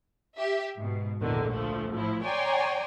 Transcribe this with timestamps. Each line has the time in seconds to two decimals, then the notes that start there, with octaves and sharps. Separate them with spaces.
0.36 G4 E5
0.78 G#2 B2
1.20 A#1 E2 D3 D#3
1.52 D2 F3 A3
1.91 A2 F3 E4
2.23 C#5 D5 G5 G#5 A#5 C6